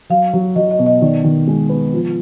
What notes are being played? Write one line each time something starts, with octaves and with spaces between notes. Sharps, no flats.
F#3 F5
F#3
F#3 D#5
D#5
B2
D#5
D#3 D5
D#3
G#3
B3
F3